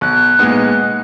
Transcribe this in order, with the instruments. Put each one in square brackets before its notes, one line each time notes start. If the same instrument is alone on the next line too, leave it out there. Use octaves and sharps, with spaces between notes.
[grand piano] B1 [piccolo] F#6
[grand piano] A#2 G#3 B3 D#4